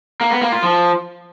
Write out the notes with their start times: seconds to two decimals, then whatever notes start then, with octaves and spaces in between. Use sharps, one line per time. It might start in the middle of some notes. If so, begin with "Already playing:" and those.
0.21 A#3
0.31 B3
0.42 A#3
0.52 F4
0.63 F3